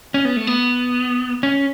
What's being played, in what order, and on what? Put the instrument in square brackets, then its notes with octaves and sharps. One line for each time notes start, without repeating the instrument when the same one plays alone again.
[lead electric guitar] C#4
B3
A3
B3
C#4